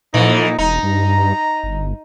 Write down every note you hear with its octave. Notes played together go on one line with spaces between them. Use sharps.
F2 A#2 E3 D#4
E1 D#4 A#5
G2
G1